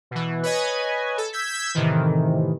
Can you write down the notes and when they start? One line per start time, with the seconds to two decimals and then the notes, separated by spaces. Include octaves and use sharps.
0.11 B2 E3
0.43 B4 C#5 D#5 G#5
1.17 A4
1.33 E6 G6 G#6 B6
1.75 A2 C3 D#3 E3